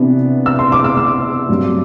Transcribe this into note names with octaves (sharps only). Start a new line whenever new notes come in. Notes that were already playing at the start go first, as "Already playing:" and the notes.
Already playing: C3 E3 B3 D4
E6
C6
D6
E6
E6
G2 F#3 C4